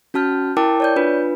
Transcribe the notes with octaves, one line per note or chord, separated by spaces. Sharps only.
C#4 F#4 A5 F6 G6
E4 A#4 G5 A5 D6
C#5 D5 G6
D4 F4 B4